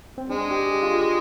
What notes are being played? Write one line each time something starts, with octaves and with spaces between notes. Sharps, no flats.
C4
G#3 D4
G4
G#4
F4
G4